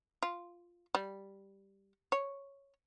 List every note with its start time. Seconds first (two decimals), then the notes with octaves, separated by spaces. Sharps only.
0.23 F4
0.95 G3
2.12 C#5